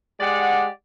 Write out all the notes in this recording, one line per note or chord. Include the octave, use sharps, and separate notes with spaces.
G#3 G4 D5 F#5